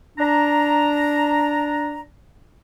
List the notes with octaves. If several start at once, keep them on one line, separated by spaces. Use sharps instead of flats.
D4 A#5